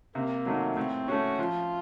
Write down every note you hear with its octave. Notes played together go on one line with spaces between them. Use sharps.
C3 A#3
D#3 F#3 A3
A2 C4
A3 C#4 F#4
F3 F4